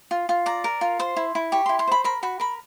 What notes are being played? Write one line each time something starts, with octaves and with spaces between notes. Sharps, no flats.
F4
F4
D5 A#5
A#4
F4
C5 C6
E4
E4
G4 C#6
E4 C6
C6
C5 B5
A#4 B5
F#4 B5
A#4 B5